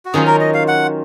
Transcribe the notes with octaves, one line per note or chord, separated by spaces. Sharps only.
F#4
D#3 F#3 C#4 F4 G#4
A#4
D#5
F5
F#5